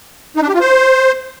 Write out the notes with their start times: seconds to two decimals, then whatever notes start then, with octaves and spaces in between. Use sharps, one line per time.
0.36 D#4
0.42 D4
0.48 G4
0.54 F4
0.60 C5